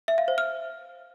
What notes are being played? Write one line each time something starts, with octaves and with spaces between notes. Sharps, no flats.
E5
F5
C5
F6